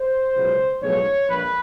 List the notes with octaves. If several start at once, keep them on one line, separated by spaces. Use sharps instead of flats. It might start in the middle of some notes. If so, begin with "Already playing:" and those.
Already playing: C5
C#2 B2 F#3 B3
B1 A2 F3 G#3 B3 C#5
A#1 A#2 G3 B4